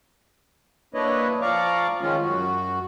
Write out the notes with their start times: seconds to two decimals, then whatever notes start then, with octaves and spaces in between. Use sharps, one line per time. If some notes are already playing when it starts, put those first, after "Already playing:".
0.94 A#3 D4 E4 B4 C#5 D#5
1.42 F3 D5 F5 A#5 C#6 D6
2.01 D#3 F3 G#3 C#4 F4
2.23 F#2 F#4